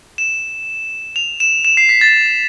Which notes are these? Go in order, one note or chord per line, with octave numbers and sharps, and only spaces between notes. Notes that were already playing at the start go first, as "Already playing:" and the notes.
E7
F7
E7
E7
C7
B6
A6